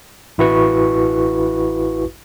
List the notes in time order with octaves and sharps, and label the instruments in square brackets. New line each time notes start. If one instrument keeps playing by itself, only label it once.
[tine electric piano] A1 E4 F#4 B4 C#6